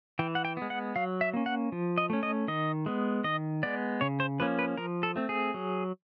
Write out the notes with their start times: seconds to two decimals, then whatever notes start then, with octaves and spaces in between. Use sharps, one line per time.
0.19 E3 G5
0.35 F#5
0.45 G5
0.57 G#3 B3
0.70 F#5
0.96 F#3 F5
1.21 E5
1.33 A#3 C#4
1.46 F#5
1.72 F3
1.98 D#5
2.10 A3 C#4
2.23 D#5
2.48 D#3 D#5
2.86 G#3 B3
3.24 D#3 D#5
3.63 G#3 B3 D5
4.01 C#3 C#5
4.20 C5
4.40 F3 A#3 C#4 B4
4.59 B4
4.78 F3 A#4
5.03 A4
5.16 A3 C4
5.29 G#4
5.54 F#3